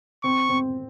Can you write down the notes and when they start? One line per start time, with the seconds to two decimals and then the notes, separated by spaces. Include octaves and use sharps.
0.24 C4 C#6
0.49 C4